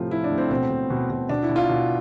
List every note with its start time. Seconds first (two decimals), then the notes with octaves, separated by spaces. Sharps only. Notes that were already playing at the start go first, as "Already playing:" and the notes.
Already playing: A2 C3 F3 F4
0.11 F3 E4
0.24 D4
0.31 A2
0.38 C4
0.51 B2 C4
0.70 B2
0.90 B2
1.10 B2
1.29 B2 D4
1.43 E4
1.49 B2
1.56 F4
1.69 B2